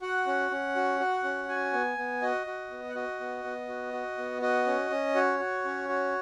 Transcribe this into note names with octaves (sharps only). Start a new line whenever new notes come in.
F#4 F#5
C#4
C#4
F#4
F#4
C#4
F#4 G#5
B3
B3
F#4 D#5
F#4
B3
F#5
F#4 D#5
B3
B3
F#4
F#4
B3
F#4 D#5
C#4
C#4
F#4 C#5
F#4
C#4
F#4